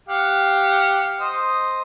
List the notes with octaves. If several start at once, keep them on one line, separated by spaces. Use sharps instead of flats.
G4 F5 F#5
C5 D#5